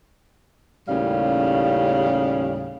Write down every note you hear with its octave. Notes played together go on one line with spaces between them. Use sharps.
D#2 A2 C#3 G3 C#4 F5